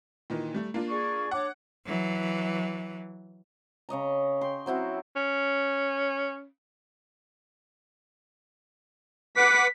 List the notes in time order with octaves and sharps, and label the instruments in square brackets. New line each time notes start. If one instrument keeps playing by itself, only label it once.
[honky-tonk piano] A#2 D#3 E3
G3 A3
A#3 D4 F4
[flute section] G#4 D5 C#6
[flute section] D4 C#5 D6 [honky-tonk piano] F#5
[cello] E3 F#3
[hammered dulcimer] C#3 C#5 D#5 A#5
G5 C6
F#3 C4 E4 F#4
[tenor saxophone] C#4
[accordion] B4 F#5 D6 [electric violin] B6